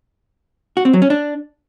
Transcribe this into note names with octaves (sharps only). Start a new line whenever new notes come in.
F#4
C4
F#3
C#4
D4